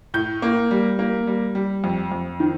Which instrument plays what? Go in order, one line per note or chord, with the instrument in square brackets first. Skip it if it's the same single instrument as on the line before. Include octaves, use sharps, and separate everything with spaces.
[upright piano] A2 G6
A#3
G3
A#3
G3
G3
F2
F2
D#3